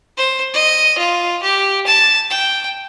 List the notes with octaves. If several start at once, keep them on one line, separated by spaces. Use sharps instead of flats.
C5
D#5
F4
G4
A5
G5